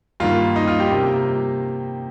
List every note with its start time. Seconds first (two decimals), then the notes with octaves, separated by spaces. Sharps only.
0.20 G2 D#3 A#3 F4
0.56 D#4
0.67 F4
0.80 G4
0.92 C3 G3 A#3